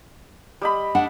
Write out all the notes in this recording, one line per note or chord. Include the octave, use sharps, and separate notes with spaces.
G3 D#5 B5
D4 F#5